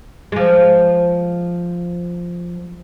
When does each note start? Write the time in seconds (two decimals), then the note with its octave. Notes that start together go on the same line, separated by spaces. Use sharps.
0.32 F3 G#3